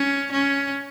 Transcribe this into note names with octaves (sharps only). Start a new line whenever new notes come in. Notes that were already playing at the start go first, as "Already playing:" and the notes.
Already playing: C#4
C#4